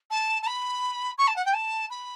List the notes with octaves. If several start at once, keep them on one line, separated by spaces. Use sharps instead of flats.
A5
A5
B5
C#6
A5
F#5
G5
A5
B5